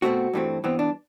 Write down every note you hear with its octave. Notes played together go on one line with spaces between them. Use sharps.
B2 A3 C4 F#4
G2 E3 A3 C4
G2 E3 B3 C4
D4